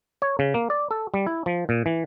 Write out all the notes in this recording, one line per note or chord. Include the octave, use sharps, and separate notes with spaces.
C#5
C#3
A#3
D5
A4
G3
E4
F3
A#2
E3